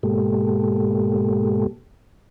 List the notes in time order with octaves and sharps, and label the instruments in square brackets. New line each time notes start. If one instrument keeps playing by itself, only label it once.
[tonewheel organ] G#2 B2 G#3 A#3 G4 A4